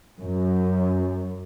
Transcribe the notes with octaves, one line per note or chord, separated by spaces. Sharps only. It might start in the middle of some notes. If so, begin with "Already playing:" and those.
F#2